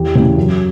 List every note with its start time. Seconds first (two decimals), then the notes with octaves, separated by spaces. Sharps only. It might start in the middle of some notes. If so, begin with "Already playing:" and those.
Already playing: E2 G4
0.15 C#3 E3
0.36 F#2